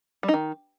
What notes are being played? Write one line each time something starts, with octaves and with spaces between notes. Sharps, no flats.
G3
D#4
D#3